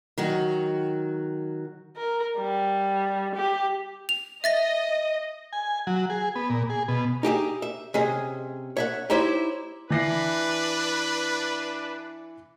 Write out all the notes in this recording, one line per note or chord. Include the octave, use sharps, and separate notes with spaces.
D#3 F#3 F#4
A#4
G3
G4
F7
D#5 E5 A6 A#6
G#5
F#3
G#4
B3
A#2
G#4
B2
D#4 G4 G#4 E5
E5
C3 C#4 G#4 D#5
C#5 E5 F#5
D#4 E4 G4 C5 C#5 E5
E3 D4 B4 A#6 C7